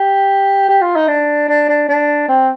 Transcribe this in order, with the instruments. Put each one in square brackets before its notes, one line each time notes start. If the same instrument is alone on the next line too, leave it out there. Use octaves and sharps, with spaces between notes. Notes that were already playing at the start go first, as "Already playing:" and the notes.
Already playing: [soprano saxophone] G4
G4
F4
D#4
D4
D4
D4
D4
C4